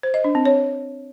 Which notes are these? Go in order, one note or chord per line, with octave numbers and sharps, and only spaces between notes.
C5
D#5
D4
C4
C#5